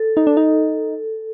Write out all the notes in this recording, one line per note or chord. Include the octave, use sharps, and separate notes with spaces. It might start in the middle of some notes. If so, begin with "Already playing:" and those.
Already playing: A4
D#4
D4
D#4